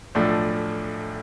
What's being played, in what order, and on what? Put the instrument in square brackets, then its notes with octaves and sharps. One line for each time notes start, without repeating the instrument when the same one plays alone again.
[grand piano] B1 A2 F3 A3 D4